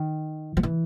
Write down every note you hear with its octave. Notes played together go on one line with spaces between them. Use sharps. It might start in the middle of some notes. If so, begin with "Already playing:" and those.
Already playing: D#3
F3
E3